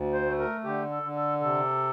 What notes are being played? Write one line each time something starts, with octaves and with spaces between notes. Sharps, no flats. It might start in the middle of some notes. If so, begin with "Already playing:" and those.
Already playing: D2
C5
A3
A#4
D3 G4
A4
D3
A4
C3 A4